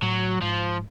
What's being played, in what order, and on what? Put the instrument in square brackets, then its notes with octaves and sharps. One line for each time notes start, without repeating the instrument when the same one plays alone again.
[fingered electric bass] A2 [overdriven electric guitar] F#3
[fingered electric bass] G#2 [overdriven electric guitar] F3